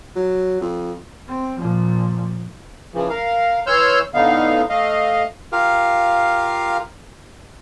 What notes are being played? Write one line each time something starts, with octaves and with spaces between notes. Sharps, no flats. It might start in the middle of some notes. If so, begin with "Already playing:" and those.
F#3
F2
C4
A#2 F3
C#3 E3 F3
A#4 F5
E3 C#5 C6 E6 F6 G6
A2 D3 B3 D#4 F5
A3 D#5 F5
F4 G4 A#4 F5